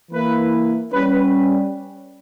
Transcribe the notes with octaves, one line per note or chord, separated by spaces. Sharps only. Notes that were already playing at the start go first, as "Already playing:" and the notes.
E3 A#3 E4 B4
G3 C#4 B4